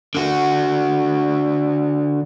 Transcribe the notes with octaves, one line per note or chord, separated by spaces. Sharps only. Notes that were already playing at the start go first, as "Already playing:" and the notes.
D3 F#4